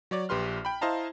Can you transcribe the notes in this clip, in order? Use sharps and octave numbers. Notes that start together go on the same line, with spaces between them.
F#3 C#5 D5
A#1 G4 B4 C6 F6
G5 B5
E4 C5 D#5 F5 A5 A#5